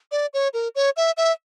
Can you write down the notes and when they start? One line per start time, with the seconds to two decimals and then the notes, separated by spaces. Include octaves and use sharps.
0.11 D5
0.34 C#5
0.53 A#4
0.75 C#5
0.97 E5
1.17 E5